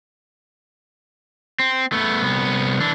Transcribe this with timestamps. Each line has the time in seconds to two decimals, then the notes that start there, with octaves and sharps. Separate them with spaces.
1.60 C4
1.92 A3 B3
2.22 C2 B3
2.80 E3 D4